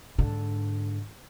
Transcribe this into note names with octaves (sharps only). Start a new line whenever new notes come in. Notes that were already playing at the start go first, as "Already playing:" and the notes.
G#2 D3